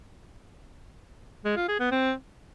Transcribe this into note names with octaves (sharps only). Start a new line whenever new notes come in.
G#3
F4
G#4
B3
C4